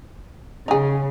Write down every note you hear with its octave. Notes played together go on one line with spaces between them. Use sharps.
C#3 D#4 G#4